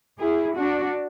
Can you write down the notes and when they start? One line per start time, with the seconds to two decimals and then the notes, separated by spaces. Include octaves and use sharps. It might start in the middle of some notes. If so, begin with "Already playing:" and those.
0.19 E4 G#4
0.57 D4 F#4